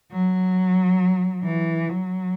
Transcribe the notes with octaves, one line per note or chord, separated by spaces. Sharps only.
F#3
E3
F#3